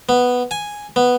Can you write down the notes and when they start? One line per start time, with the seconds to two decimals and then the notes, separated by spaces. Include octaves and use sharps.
0.09 B3
0.51 G#5
0.96 B3